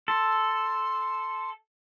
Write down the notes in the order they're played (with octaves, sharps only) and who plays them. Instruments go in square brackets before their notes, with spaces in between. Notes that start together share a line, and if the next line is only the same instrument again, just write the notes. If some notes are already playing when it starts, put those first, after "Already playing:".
[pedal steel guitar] A4 [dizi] C6